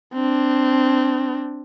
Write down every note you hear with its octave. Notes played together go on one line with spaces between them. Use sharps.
C4 D4